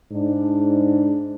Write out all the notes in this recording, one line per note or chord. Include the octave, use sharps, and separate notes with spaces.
G#2 D4